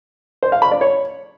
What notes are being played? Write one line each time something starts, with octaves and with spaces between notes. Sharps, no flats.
C5
F5
B5
D5
C#5